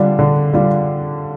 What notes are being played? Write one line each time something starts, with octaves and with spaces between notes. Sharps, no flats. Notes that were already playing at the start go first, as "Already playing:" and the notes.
Already playing: D3 G3 D4 F4
D3
G3 D4 F4